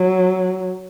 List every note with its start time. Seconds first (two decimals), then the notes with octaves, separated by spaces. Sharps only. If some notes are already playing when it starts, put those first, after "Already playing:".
Already playing: F#3